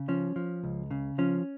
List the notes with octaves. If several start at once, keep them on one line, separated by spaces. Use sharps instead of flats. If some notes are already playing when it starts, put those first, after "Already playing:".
Already playing: C#3
F3 C#4
F3
C#2
C#3
F3 C#4